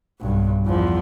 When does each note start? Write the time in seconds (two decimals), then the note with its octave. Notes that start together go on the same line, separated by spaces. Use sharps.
0.20 B1 G2
0.66 E2 F3